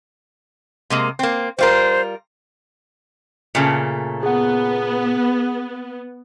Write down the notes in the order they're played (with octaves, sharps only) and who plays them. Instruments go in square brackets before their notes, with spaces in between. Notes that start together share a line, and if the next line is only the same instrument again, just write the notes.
[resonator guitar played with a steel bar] C3 G#3 A#3
A#3 C4
[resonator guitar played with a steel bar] G3 F4 A#4 [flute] C5
[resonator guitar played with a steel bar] A#2 C#3 A3
[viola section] B3 [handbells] G#4 F#5